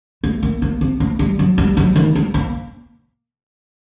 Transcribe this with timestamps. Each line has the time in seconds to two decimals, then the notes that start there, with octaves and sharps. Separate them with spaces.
0.24 A3
0.43 A#3
0.62 A#3
0.81 C4
1.00 A3
1.19 G3
1.39 F#3
1.58 G3
1.77 F#3
1.96 D#3
2.15 G3
2.34 A#3